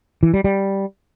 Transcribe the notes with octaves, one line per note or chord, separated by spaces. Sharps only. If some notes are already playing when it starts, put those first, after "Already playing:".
E3
G3
G3